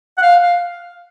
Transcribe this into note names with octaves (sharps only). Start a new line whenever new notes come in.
F#5
F5
F5